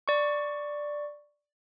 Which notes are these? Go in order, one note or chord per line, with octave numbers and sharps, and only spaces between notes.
D5 C#6